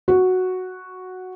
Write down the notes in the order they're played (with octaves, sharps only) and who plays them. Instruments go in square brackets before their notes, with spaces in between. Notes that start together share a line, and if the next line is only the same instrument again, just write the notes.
[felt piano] F#4